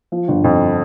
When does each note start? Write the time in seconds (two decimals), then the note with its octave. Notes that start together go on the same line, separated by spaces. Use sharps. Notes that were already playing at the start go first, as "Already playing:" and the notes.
0.12 F3
0.28 G1
0.44 F2